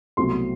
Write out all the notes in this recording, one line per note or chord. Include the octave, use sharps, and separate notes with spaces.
C2 B2 F#3 A3 C4 C6